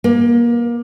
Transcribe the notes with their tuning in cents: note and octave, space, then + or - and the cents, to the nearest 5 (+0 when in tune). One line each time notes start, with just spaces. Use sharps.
A#3 +25